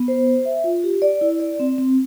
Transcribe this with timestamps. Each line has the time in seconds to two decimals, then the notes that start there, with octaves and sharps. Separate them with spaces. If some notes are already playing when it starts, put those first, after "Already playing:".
Already playing: B3
0.08 C5
0.27 C5
0.45 E5
0.64 F4
0.84 G4
1.02 D5
1.21 E4
1.40 D5
1.60 C4
1.78 C4